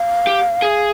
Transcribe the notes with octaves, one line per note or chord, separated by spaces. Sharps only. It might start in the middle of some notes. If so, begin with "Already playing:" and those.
Already playing: F5
G4
G#4